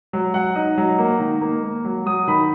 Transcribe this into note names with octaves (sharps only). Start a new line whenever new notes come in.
F#3
F#3 F#5
D#4
F#3
A#3
D#3
A#3
A#3
F#3
F#3 D#6
D#3 B5